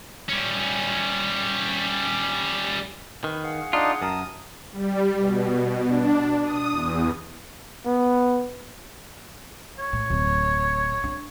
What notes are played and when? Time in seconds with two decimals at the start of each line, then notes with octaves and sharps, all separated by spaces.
0.29 G3 C#4
3.24 D#3 B4
3.44 G#4 F5 F#5
3.73 D4 D#4 F4 A5
4.02 F#2 A#4 A5 D#6
4.73 G3
5.19 B2
5.88 D4
6.43 D#6
6.72 E2
7.86 B3
9.79 C#5
9.93 A2
10.10 D1
11.04 D4